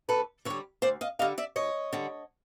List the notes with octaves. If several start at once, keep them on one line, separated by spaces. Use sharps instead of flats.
D2 A4 B4
D3 G3 B4 C#5
D2 C5 D5
D#5 F5
D3 G3 D#5 F5
D5 E5
D2 C#5 D#5
D3 G3